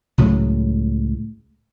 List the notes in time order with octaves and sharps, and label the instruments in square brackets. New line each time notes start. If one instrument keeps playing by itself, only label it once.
[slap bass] C#2 A2 C#3 F#3